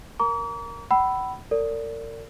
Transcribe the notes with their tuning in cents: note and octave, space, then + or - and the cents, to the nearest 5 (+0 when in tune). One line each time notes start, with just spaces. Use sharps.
A#4 +0 A#5 +5 D6 -45
F#5 +45 B5 +0 E6 +0
A#4 -45 D5 -25